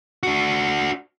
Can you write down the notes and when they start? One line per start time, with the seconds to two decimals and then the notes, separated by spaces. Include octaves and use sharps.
0.23 D4 F#4